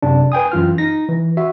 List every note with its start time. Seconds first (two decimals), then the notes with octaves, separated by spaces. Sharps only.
0.03 F#2 C3 D4
0.32 B4 G5 G#5 D#6
0.52 F#2 E3 F4 F6
0.78 D#4 A#6
1.08 E3
1.37 F#4 E5